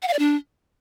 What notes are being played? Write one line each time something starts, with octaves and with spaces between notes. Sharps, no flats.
F#5
F5
D5
D4